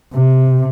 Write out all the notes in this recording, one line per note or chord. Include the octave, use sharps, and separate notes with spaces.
C3